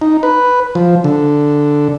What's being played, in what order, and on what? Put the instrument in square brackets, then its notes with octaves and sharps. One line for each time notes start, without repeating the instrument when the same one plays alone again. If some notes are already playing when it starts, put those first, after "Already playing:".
[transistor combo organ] D#4
B4
F3
D3